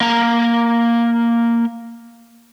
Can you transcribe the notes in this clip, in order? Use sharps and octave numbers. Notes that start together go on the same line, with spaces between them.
A#3 A#5